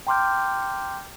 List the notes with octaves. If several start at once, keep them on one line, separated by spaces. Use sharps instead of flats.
G5 A#5 C6 D6 F6 G6